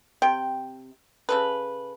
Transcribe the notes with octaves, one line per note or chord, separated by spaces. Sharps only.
C3 G5
C#3 A4 B4